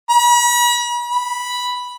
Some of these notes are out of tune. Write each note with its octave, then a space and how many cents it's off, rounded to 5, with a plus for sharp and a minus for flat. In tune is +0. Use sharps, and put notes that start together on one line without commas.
B5 -40
B5 -5